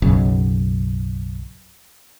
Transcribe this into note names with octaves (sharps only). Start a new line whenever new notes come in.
B1 F#2 C#3